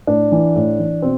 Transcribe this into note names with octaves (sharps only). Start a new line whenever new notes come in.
A2 D4
E3
A2
E3
B2 C4